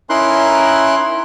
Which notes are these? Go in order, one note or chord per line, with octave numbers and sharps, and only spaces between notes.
C#4 D#4 E4 A#4 C6 F#6